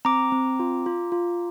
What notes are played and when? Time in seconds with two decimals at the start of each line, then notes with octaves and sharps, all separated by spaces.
0.05 C4 A#5 D6
0.32 C4
0.60 F4
0.86 F4
1.12 F4